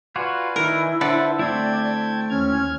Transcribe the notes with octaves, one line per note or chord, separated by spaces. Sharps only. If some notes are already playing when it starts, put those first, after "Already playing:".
F4 F#4 B4 D5 G#5
D#3 E4 A#4
D3 B4 C5 E5 F#5 A5
A3 C4 E4 D5 G5 A5 G#6
D#2 C#4 F6 G#6